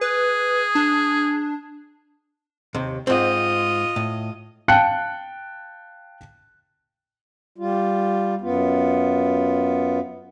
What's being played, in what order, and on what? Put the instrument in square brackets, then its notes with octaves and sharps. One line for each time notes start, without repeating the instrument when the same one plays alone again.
[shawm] G#4 [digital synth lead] B4
[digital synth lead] D4
[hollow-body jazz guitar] D#2 C3
[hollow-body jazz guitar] G#2 C4 [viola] F4 D#5
[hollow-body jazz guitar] A2
[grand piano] F5 G5 A5 F#6 C#7
[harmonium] G3 F4
F#2 B3 F4